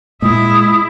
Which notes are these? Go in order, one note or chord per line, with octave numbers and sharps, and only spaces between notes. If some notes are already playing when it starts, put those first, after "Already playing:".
A#2 G#3 E4 D#6